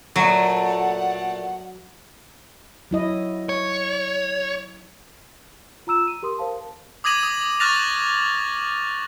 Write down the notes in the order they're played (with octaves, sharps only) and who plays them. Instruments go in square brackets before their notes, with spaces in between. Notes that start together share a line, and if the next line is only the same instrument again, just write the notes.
[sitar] A#2 A3 [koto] F#3 [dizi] F#5
[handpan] F#3 E4 D#5
[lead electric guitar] C#5
[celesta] F4 A#5 E6 E7
D#7
G4 A#4 C6 D#6
A#4 C5 F5 A5
[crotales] D6 D#6 G#6 A#6 D#7 F#7
D#6
C#6 F6 F#6 A6 A#6 F7